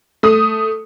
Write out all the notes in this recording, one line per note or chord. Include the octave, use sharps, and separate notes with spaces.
A3 D#6